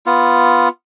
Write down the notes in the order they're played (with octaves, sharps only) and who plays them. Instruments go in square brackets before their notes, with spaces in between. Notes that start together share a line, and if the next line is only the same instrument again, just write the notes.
[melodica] B3 F4